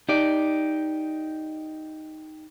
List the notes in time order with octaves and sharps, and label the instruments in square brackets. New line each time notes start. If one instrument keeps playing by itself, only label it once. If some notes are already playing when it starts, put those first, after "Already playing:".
[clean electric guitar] D#4 G4 D5